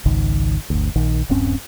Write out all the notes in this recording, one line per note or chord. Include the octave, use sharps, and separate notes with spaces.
G#1 C#2 D#3
G1 D2
A#1 D#3
D#1 G2 C4 C#4